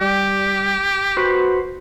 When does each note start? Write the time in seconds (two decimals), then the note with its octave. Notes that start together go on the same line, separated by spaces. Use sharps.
0.01 G3 G4
1.17 F#4 B4 C5